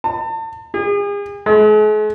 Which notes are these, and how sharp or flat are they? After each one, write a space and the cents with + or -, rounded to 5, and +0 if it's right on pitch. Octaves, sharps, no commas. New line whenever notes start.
A5 +40
G#4 -40
G#3 +45